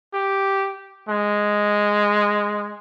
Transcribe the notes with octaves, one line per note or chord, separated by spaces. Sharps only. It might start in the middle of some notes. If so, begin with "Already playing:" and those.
G4
G#3